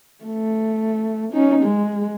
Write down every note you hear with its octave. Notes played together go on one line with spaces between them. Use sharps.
A3
C#4 D#4
G#3